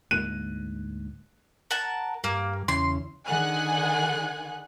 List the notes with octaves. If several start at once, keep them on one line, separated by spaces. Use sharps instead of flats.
D2 G#2 A#3 F#6 D#7
A#4 F#5 A5
G2 A#3
E2 C#3 C6
D3 D#3 G#4 F#5 G#5 F#6